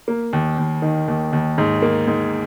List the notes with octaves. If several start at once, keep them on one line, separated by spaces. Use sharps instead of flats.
A#3
D#2
D#2
D#3
D#2
D#2
G#2
A#3
G#2